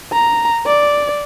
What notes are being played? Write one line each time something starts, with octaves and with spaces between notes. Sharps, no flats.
A#5
D5